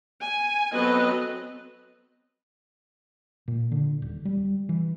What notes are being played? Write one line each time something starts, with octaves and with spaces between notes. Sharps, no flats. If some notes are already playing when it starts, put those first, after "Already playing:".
G#5
F#3 B3 C4 A4 B4 D#5
A#2
D3
D#1
G3
E3